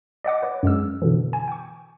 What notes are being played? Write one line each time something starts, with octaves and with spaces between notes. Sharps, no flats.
D5 D#5 F#5 D6
B4 C#5 D5
F#2 G#3 E6
B2 D3 E3
G#5
G5 C#6